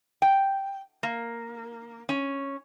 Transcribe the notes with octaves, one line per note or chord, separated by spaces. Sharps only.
G5
A#3
C#4